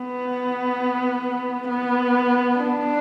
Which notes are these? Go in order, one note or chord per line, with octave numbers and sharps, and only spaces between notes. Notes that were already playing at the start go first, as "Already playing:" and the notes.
Already playing: B3
B3
D4